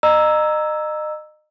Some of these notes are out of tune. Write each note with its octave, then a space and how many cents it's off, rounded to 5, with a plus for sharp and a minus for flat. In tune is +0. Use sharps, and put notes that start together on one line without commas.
D#5 -30 A#5 +0 E6 +0